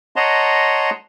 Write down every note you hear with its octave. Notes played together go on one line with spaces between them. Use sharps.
C#5 D#5 F#5 A5 A#5 C6